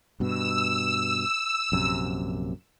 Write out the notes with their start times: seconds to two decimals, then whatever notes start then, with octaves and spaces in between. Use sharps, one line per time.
0.20 G2 B2 E6
1.72 A#1 F#2 C3